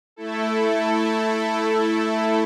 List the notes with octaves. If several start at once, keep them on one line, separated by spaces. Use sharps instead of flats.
A3 E4 A4